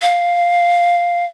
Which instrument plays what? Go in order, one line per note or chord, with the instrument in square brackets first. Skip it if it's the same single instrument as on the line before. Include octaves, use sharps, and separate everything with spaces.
[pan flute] F5